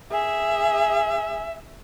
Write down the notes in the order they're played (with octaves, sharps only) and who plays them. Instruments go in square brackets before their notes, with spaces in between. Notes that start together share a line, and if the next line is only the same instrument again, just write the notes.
[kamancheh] G#4 [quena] E5